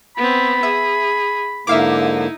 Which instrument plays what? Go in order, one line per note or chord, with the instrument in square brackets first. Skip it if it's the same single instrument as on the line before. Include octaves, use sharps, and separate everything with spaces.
[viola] B3 C4 [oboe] B5
[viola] G#4 [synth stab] E5
[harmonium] G#2 D3 A#3 [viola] D#4 E4 [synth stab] E5 F5 D6